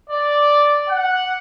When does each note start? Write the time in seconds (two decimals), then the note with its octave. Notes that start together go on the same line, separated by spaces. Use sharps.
0.10 D5
0.88 F#5